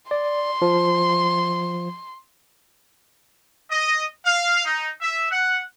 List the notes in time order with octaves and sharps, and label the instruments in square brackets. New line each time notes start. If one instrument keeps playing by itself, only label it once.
[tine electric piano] D5 [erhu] C6
[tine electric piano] F3
[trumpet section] D#5
F5
D#4
E5
F#5